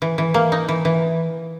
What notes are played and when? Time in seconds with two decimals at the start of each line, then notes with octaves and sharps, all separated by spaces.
0.02 E3
0.18 E3
0.34 A#3
0.52 D#4
0.68 E3
0.85 E3